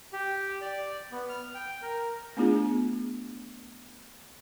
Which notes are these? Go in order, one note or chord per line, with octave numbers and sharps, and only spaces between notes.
G4
D5
B3
F6
G5
A#4
A3 B3 D4 F4 G#4